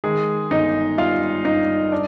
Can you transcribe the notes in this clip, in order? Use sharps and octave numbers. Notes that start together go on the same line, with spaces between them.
D#3 G#3 G#4
G1 D#4 D#5
G3 F4 F5
G2 D#4 D#5
D4 D5